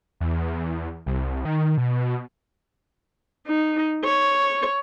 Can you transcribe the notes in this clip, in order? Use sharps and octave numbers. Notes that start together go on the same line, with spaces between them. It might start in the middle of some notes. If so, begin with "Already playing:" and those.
E2
C2
D#3
B2
D#4
C#5